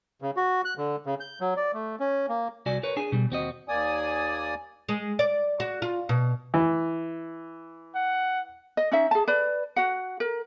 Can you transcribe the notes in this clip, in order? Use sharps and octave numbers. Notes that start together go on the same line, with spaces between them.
C#3
F#4
F#6
D3
C#3
G6
F#3
D5
A3
C#4
A#3
C2 F#4 D5 G#5
A#4 B4 C#5
D4 G#4 G#5
B2 G3
D#2 C4 F#4 D#5
D#2 A#3 D5 G#5 D#6
G#3
D5
F#4
F4
B2
E3
F#5
D#5
C#4 D#4 E5
G#4 A5
B4 D5
F#4 F#5
A#4